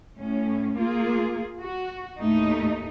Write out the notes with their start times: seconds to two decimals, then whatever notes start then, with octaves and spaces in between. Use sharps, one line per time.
0.18 A2 C#4
0.77 A#3 F4 G#4
1.59 F#4
2.18 D#2 A2 A3 D#4